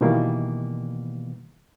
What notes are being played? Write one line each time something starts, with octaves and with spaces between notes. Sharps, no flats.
B2 D#3 E3 G3 A#3 B3